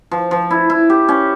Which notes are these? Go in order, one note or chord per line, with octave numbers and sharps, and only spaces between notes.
F3
F3
E4
E4
G4
C#4